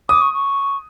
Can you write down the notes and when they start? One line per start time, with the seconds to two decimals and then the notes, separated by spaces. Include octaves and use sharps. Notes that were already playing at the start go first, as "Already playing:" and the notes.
0.09 D6 D#6
0.22 C#6
0.33 C#6